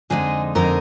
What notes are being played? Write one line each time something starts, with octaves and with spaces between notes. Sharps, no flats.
F2 D3 G#3 D#4 G#4
F2 D3 G#3 D#4 A#4